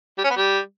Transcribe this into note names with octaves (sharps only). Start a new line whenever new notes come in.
G3
C#4
B3
G3